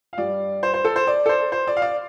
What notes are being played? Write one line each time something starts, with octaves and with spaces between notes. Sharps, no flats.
F5
G2 G3 D5
C5
C5
A4
C5
D5
A4
C5
C5
D5
F5
D5